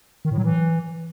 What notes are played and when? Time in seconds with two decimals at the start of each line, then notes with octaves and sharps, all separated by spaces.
0.25 D#3
0.31 A2
0.38 F#3
0.44 E3